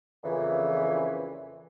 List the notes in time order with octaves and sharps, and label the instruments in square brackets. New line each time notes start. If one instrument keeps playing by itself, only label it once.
[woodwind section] F2 A#2 C#3 E3